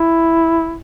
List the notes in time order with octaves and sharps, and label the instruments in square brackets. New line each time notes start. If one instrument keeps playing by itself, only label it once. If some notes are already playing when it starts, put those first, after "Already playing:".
Already playing: [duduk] E4